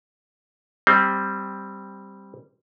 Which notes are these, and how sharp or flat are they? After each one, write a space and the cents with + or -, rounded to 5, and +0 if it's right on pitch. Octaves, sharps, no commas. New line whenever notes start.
G3 +0 C4 +5